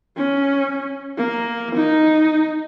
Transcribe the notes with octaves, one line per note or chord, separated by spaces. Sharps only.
C#4
A#3
D#4